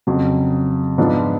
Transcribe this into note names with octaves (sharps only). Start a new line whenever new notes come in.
F2 C#3 F#3
G#2 F3 B3 D4 F4